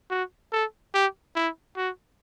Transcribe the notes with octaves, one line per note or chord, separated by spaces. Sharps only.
F#4
A4
G4
E4
F#4